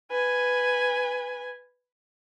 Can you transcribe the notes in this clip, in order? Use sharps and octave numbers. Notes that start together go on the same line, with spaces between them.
B4 G#5